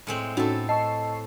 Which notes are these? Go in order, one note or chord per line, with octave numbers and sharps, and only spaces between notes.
A2 G#3 C4
A2 C#4 D#4 F#4 A4
D#5 A5 C#6 E6 C7